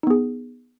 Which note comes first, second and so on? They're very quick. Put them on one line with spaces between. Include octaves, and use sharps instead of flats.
D#4 B3 G#4